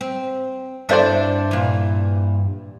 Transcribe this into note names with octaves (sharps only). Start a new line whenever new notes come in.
C4
G2 C4 D4 E4 A4 C5 D5
A#2 E3